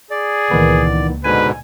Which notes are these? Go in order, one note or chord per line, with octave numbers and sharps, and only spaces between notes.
G#4 D5
C#2 A#2 D#3 E3 B3
G#2 B2 D3 B4 G#5